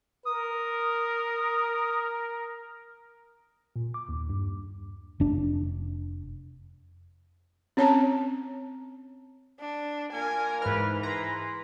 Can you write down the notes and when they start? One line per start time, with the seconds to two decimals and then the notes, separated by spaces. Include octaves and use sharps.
0.25 A#4 D#6
3.76 A#2
3.94 D6
4.09 D#2
4.30 G2
5.20 F1 D4
7.77 C4 C#4 C#5 A5 A#5
9.60 D4
10.13 A#2 A#3 A#4 G#5
10.62 G#2 E3 B4 F6
11.03 E4 G#4 B4 A#5 C6